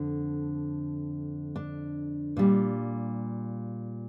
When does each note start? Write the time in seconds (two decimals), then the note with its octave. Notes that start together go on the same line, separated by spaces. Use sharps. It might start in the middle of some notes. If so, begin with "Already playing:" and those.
Already playing: F2 D3
1.56 D4
2.37 A#2 G3